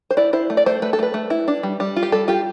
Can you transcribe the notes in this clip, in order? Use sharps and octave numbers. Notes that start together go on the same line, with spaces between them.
C5
E4 D5
E4 C5
A3
D5
A3 C5
A3 B4
A4
A3 B4
A3
E4
D4
G3
G3
F4
G4
G3 A4
F4 G4